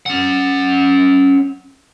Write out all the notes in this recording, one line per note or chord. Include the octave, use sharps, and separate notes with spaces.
C#4 F#5